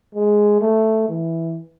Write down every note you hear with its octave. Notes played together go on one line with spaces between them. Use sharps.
G#3
A3
E3